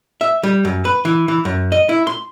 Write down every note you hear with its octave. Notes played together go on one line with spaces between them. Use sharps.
E5
G3
F#2
B4
E3
E3
F#2
D#5
E4
C6